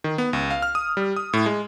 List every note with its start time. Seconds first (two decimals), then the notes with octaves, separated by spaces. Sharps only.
0.04 D#3
0.18 B3
0.33 C#2
0.50 F5
0.62 F6
0.75 D#6
0.97 G3
1.16 D#6
1.33 A2
1.46 G#3